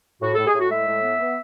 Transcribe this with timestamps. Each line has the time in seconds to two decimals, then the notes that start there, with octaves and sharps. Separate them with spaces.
0.22 A2 F#4
0.35 A2 A4
0.47 G#4
0.55 A2 F#4
0.71 G#3 E5
0.87 A2
1.03 B3
1.20 B3